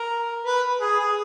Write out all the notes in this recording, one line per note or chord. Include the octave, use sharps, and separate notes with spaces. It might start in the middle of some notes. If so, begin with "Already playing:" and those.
Already playing: A#4
B4
G#4
G#4